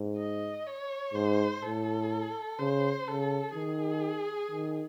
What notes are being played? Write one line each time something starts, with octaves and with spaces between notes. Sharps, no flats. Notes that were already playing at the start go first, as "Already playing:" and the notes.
Already playing: G#2
D#5
C#5
G#2 C5
A2 A4
C#3 C5
C#3 A4
D#3 G#4
D#3